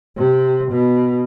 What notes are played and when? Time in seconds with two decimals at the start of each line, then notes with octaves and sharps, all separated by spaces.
0.17 C3
0.71 B2